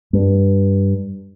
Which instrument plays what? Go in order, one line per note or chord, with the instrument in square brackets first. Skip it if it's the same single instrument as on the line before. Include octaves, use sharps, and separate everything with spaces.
[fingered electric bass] G2